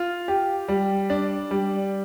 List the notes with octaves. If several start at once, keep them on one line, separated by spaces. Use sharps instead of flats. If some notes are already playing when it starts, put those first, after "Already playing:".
Already playing: F4
G4
G3
D4
G3